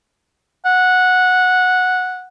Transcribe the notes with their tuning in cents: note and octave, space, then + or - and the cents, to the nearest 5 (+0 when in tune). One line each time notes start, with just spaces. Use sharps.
F#5 -10